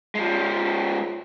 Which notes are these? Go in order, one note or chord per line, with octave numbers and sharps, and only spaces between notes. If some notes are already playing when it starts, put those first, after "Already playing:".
F3 G#3